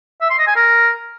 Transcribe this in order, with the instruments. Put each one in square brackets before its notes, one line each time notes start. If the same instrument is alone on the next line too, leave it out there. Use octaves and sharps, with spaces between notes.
[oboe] E5
C6
D#5
G#5
A#4